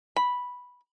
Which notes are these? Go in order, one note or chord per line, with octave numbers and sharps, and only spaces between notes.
B5